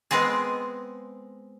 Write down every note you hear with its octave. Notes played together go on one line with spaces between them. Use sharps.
G#3 B3 C4 G#4